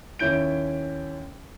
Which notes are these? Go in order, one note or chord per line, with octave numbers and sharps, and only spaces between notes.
D#2 C#4 E4 G6 D7